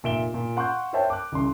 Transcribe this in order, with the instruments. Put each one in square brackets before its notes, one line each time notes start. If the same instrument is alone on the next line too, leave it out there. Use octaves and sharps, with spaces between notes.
[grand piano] F1 A#2 E5 D7 E7 G7
A#2
F5 F#5 C6 C#6 F#6 G6
A#4 C5 C#5 E5 G5 A5
D6 F#6
C2 C#3 C6